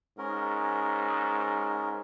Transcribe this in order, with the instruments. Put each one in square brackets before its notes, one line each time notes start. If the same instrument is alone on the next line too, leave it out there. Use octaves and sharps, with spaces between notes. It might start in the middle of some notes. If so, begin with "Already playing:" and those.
[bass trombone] G#2 [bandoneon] C#4 A#4